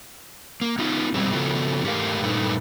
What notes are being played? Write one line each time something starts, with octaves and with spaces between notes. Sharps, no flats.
A#3
B3 D#4 F4
F2 B2 G3 G#3 C4
C#3 F3 B3 F4 F#4 A4
G#2 A3 G4 A4 A#4 F5
G2 A#2 A3 D#4 B4